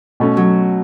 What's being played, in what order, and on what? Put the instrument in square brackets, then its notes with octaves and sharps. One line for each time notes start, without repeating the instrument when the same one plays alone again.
[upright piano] B2 A3 C#4
[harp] F#3